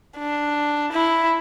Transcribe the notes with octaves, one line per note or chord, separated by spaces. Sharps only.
D4
E4